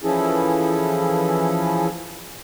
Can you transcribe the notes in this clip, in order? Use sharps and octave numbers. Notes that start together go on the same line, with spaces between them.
E3 F3 C#4 E4 G#4 A4